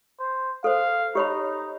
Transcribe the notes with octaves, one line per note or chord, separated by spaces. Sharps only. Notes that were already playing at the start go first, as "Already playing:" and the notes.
C5
A4 C5 F5
D#4 G4 C#5 B5